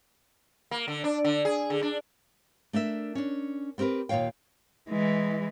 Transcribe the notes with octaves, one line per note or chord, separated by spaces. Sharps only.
A#3
D3
D4
D3
G#4
D3
D4
A3 D4 A#4 E5
C#4 D4
B3 C4 G4 A#4 B4
D#2 A#2 E3 C#5 F5 G5
E3 G#3